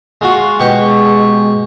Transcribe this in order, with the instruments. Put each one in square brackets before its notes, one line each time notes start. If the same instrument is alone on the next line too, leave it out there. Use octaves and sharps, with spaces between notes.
[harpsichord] G#3 F4 F#4
[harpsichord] B2 G4 C#6 [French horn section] G#3